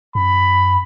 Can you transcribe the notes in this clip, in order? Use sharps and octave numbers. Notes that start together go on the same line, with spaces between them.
F#2 B5